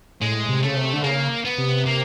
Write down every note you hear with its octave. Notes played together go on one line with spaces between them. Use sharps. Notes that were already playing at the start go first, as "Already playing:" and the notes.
A2 G#3
C3
C#3 A3
C3
D3
C#3 A#3
B3
C3
A#3